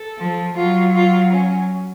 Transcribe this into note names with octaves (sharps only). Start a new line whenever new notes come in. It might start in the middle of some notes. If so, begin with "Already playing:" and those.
Already playing: A4
F3
F#3 F4
F4
C#4